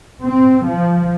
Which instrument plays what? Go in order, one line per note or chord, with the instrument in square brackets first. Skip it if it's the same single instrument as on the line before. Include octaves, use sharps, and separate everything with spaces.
[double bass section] C4
F3